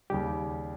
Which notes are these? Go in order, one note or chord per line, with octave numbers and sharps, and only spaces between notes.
D#2 C#3 G3 G4